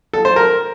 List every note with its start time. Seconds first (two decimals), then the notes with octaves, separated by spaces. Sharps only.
0.13 A4
0.25 C5
0.36 A#4